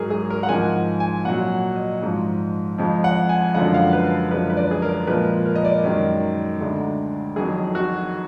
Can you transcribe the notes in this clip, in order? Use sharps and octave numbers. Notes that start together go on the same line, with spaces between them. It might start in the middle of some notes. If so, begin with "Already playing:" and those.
Already playing: G#2 F#3 G#4 A#4
G#4
A#4
F#5
G#2 F3 G#3 G#5
G#5
A#2 F#3 F#5
D#5
G#2 F3 G#3
F2 F3 G#3
F#5
G#5
F#2 D3 F3 G#3 F#5
F5
B4
F#2 D3 F3 G#3 B4
B4
D5
G#4
A#4
A#2 F3 G#3 B4
A#4
D#5
D5
F#2 D#3 G#3
D2 D3 G#3
F2 D#3 F#3 G#4
F#4